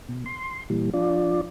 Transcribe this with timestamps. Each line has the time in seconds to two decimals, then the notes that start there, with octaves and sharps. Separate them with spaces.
0.09 B2
0.26 C6
0.70 A#2 E3 G3
0.94 F3 D4 F4 D5